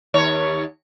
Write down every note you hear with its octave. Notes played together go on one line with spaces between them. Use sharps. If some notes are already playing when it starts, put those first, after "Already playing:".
D#2 C#5